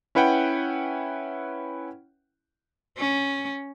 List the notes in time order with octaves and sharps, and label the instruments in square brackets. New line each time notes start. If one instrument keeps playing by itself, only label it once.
[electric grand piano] C#4 E4 B4 F#5 G5
[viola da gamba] C#4